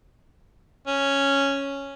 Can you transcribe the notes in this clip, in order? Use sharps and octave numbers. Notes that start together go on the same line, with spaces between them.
C#4